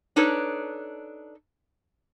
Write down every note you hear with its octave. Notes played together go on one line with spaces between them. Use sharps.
D4 D#4 A4 B4 C#5